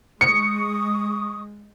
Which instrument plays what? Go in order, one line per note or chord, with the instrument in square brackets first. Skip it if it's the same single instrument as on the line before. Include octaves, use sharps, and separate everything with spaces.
[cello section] G#3 [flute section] C#6 D#6 [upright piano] C#7